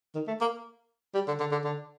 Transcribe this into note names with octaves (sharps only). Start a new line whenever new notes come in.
D#3
A3
A#3
G3
D3
D3
D3
D3